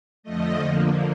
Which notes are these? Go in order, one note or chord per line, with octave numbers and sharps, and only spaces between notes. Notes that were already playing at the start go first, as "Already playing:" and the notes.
F2 D3 F3 A3 D#5
D3 F3 A#3